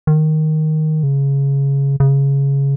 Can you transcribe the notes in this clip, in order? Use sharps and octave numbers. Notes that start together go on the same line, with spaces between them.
D#3
C#3
C#3